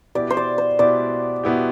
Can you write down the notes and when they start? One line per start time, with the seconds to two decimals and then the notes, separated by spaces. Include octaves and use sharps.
0.15 B2 B3 E4 G4 D5
0.30 C5
0.37 D5
0.58 C5
0.79 B2 B3 E4 G4 D5
1.44 B2 B3 E4 G4